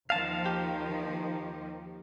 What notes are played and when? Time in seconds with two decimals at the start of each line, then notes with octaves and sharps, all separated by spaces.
0.10 D#2 D#3 F3 F5 A5
0.46 G4